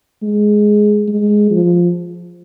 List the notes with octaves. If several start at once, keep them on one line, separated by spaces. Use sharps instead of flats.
G#3
G#3
F3